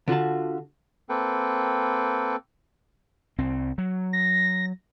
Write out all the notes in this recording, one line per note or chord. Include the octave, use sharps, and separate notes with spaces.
D3 F4 F#4 A5
A#3 C4 A4 B4 G5
C2 C4
F#3
A#6